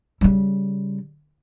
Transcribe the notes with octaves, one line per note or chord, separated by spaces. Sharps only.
C#3 G3